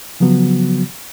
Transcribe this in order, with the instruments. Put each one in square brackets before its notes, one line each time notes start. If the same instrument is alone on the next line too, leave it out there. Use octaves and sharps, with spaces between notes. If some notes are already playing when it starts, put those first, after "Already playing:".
[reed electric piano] C#3 F3 F#3 B3 F#4